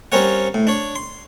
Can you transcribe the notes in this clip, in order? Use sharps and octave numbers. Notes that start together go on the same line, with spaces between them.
G3 C4 C#4 A#4 C#5 F#5
A2
D4 C#5
C6